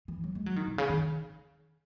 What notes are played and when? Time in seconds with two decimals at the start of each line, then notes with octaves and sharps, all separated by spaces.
0.08 E3
0.24 F#3
0.35 G#3
0.46 F#3
0.56 D#3
0.67 B2
0.78 C#3
0.89 D#3